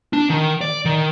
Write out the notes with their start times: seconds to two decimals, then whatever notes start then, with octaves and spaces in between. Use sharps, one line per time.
0.13 D4
0.30 D#3
0.61 D5
0.85 D#3